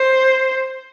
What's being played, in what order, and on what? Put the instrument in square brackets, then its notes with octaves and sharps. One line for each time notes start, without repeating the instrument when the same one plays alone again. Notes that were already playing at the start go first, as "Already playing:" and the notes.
Already playing: [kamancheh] C5